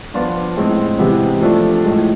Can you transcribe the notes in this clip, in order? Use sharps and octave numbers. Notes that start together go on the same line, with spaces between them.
F3 B3 D4 F4
A2 G#3 C4
C3 E3 G#3 B3
F3 A3 D4
A2 F3 G#3